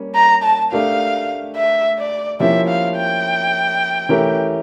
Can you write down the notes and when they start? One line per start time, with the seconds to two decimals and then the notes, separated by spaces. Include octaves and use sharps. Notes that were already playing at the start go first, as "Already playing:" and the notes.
Already playing: G3 A#3 C#4
0.15 A#5
0.43 A5
0.71 A3 D4 G4 A#4 F5
1.56 E5
1.98 D5
2.40 F3 A#3 C#4 E4 G4 E5
2.68 F5
2.96 G5
4.09 E3 A3 C#4 G4 A#4